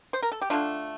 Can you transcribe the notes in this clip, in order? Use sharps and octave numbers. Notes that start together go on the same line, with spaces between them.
C5
A#4
A4
G4
D3 A3 D4 F4